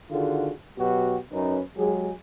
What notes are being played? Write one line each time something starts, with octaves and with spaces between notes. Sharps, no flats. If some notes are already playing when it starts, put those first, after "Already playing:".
D3 D#3 F4 F#4 G#4
B2 F#3 F#4 G4
F#2 C#4 D#4 B4
F#3 G#3 G4 G#4